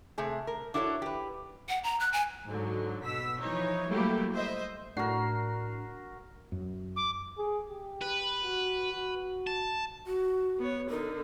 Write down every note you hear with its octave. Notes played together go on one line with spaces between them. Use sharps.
C3 A3 G#4
A#4
D4 E4 F#4 A4 C5 C#5
G4 B4
F#5
A#5
F#6
G#5
G#2 D3 F#3
B2 E6 B6
E3 F3 D#4 C#5
F#3 G3 A3 A#3 E4 G4
C5 D#5 E5
A2 D4 F#4 A#4 C7
F#2
D6
G#4
G4
B4
F#4
F#4
A5
F#4
B3 C#5
D3 D#4 A#4